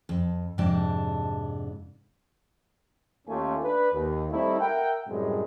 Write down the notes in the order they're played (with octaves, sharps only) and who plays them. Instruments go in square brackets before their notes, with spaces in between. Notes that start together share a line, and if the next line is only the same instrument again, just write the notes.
[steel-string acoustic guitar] F2
F2 G#2 C3 D4 A5
[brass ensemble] D#2 A3 C#4 F4 G4 G#5
D4 B4
D#2
G3 A3 C4 D#4 E4
A#4 E5 F#5 G5
F#2 A2 C3 G3 G#3